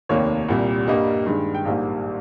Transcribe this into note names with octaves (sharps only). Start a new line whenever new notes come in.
F1 D#2 D#3 A#3 C#5
C2 A#2 G3
G2 G3 A#3 D#5
G2 D#3 G#3
G5
A#1 G#2 G3 A#3 F5